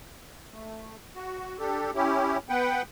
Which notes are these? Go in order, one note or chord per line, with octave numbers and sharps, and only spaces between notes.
A3
F#4
D4 G4 A4
C#4 E4 G4
B3 B4 F#5 G5